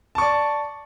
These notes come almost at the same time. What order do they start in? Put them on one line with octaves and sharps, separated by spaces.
A5 C#6 D5